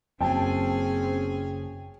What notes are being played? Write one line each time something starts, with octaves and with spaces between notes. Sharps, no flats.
F#1 F#2 C#3 C4 C#4 G#4 G5 A5